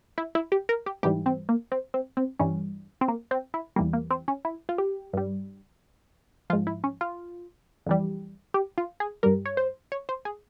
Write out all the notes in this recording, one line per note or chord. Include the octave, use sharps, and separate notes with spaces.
E4
E4
G4
A#4
G4
G#2 E3 G3 G4
C4
A#3
C4
C4
C4
G2 E3 G3 C#4
C4
A#3
C4
E4
E2 E3 G3 A#3
A#3
C4
C#4
E4
F4
G4
G2 G3
G#2 F3 F4
E4
C#4
F4
F2 E3 G3
G4
F4
G#4
G2 G3 A#4
C#5
C5
C#5
C5
G#4